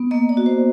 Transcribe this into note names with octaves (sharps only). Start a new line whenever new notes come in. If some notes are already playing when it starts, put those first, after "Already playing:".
Already playing: B3
A#3 D#5
D5
F#4
C5